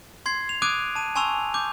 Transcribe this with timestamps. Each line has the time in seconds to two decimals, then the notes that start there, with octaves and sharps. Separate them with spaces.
0.26 C6 G#6 C7
0.49 F7
0.62 D6 D#6 F#6 G#6 D7 D#7
0.96 A5 D#7
1.16 G#5 A5 C6 C#6 E6 F7
1.54 D6 G6